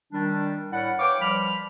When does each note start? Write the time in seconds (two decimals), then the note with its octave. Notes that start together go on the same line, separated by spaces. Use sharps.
0.13 D#3 G3 D4
0.72 A2 E4 A#4 D5 F#5
0.99 B4 C#5 F5 G5 D6
1.21 F3 G3 B5 F6